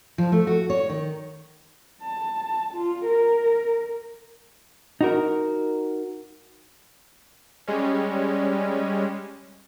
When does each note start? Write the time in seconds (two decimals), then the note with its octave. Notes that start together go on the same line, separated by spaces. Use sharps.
0.18 F3
0.32 A3
0.47 F#4
0.70 C#5
0.89 D#3
2.03 A5
2.74 F4
3.06 A#4
5.01 D#4 F#4 A#4
7.67 G3 G#3 C#4